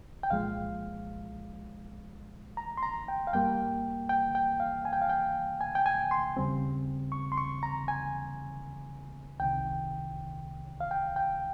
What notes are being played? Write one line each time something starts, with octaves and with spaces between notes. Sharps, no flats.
G5
C2 A#2 F3 G#3 F5
A#5
C6
A#5
G5
F5
G2 G3 A#3 G5
G5
G5
F5
G#5
G5
F5
G5
G#5
G5
G#5
C6
D#2 C#3 G3 C4
C#6
C6
C#6
A#5
G#5
C2 C3 D#3 G5
F5
G5
G5